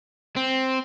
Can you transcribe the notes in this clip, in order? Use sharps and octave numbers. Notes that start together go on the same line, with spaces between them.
C4